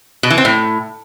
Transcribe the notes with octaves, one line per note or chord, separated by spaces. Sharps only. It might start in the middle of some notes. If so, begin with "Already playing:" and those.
B2
E3
C4
A2